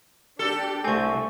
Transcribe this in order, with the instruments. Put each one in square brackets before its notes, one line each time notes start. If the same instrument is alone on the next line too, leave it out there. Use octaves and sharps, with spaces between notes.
[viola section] D4 G4 [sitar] A4
[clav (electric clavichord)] C2 C4 [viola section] A3 [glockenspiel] G#5 C#6